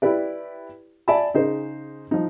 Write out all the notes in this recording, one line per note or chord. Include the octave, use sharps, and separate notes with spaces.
E4 G4 B4 D5
D5 E5 G#5 A5 B5
C#3 D#4 G#4 C5
F3 D#4